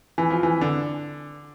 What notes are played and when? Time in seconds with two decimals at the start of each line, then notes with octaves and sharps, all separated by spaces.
0.18 E3
0.30 F3
0.43 E3
0.61 D3